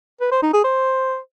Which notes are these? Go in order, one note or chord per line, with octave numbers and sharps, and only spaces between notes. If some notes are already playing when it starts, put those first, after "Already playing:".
B4
C5
D#4
G#4
C5